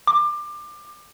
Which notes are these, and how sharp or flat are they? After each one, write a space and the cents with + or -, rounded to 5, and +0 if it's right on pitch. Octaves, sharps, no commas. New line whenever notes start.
D6 +25